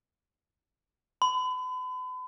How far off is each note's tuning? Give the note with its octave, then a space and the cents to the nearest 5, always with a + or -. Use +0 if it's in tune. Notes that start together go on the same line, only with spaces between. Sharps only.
B5 +40